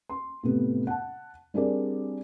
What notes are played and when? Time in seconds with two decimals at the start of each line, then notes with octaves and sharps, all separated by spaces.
0.10 C6
0.43 A2 C3 B3
0.87 F#5 A5
1.54 G3 C4 D4 G#4 A#4 D5